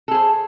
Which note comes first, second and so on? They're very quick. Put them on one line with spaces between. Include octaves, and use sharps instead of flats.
A4 G#4 C5